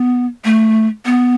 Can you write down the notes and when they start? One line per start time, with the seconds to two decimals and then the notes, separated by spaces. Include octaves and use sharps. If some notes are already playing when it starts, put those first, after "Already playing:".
Already playing: B3
0.45 A3
1.05 B3